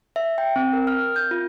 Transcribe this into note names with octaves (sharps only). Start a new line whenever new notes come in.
E5
G5
C4
A#4
F6
G6
F4